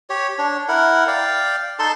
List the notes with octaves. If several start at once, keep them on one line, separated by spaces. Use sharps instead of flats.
G4 C#5
D4 C#5
E4 A#4 F#5
D5 F5 G5
D#4 A4 A5 C6